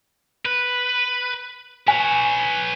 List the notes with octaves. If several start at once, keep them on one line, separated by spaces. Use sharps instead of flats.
B4
B4 C#5 G#5